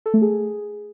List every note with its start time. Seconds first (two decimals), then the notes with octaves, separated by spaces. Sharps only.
0.06 A4
0.14 A3
0.22 G#4